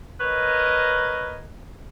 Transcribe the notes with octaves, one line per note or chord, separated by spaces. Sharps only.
A#4 B4 C#5 D#5